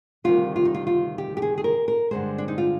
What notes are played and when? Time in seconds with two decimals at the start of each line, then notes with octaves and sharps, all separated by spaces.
0.24 D2 C3 D#3 G3 F4
0.56 F4
0.65 D#4
0.74 F4
0.87 F4
1.18 G4
1.37 G4
1.42 G#4
1.58 G#4
1.64 A#4
1.88 A#4
2.11 G2 D3 F3 G#3 C5
2.38 D4
2.48 D#4
2.58 F4